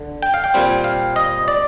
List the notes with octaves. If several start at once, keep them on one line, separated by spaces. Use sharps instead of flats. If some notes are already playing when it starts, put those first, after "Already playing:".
Already playing: D3
G5
F5
G5
A#2 G3 C4
F5
D#5
D5